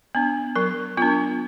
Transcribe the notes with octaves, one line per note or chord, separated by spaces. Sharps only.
B3 D4
F#3 A#4
B3 D4 F4